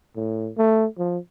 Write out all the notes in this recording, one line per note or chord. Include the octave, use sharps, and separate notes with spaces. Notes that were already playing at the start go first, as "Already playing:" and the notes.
A2
A3
F3